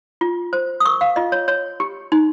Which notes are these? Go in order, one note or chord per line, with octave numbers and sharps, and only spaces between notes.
F4
C5
D#6
A#4 C#6
F5
F4 D#5
C#5
C#5
G4
D#4